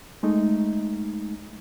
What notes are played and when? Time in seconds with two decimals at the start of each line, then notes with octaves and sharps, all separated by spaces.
0.23 G#3 A3 D#4